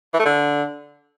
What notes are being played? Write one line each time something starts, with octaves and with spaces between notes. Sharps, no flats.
E3
A3
D3